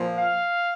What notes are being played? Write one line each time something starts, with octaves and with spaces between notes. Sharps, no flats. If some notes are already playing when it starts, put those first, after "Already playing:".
Already playing: A#2 F3
F5